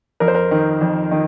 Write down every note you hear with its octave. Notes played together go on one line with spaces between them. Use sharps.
F2 A#4
C5
A#4
D#3
F2
D#3